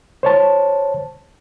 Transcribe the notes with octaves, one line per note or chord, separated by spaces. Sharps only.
C5 C#5 A5